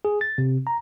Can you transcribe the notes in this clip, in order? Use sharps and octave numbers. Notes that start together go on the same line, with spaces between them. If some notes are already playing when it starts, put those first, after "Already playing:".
G#4
A6
C3
A#5